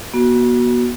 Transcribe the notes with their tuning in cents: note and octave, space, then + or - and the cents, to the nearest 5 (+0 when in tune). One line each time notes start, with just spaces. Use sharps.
B3 -40 F#4 +0